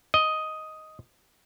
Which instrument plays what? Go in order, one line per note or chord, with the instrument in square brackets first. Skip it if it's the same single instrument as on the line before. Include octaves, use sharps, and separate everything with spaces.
[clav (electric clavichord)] D#5